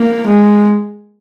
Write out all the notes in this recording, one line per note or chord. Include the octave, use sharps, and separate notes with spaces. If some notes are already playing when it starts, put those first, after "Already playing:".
Already playing: A#3
G#3